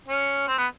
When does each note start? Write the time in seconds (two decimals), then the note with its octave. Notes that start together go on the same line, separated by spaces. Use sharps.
0.08 C#4
0.47 C4
0.58 B3